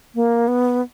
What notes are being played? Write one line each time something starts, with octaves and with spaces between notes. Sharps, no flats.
A#3
B3